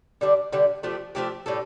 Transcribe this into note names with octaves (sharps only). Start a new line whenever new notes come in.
D3 G3 D4
D3 G3 D4
F3 A3 D4 G4
F3 A3 D4 G4
A2 G3 D4 A4